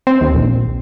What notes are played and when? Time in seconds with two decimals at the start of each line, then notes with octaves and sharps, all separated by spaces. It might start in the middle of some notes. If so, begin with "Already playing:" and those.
0.07 C4
0.21 D#2
0.35 A#1